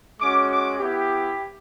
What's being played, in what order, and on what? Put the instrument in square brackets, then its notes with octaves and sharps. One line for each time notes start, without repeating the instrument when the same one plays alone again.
[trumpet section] G#3 C#4 F#4 D6
D6
B3 E4 G4